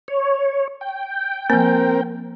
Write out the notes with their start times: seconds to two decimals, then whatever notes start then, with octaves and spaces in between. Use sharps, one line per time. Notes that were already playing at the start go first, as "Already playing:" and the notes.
0.08 C#5
0.81 G5
1.50 F3 A#3 C4 A#4